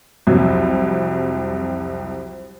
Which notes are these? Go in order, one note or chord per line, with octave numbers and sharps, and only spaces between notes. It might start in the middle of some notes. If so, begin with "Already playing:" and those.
C2 F2 F#3